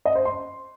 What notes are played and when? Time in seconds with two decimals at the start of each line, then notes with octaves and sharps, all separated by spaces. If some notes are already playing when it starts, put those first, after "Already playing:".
0.05 D#5
0.15 C5
0.25 C6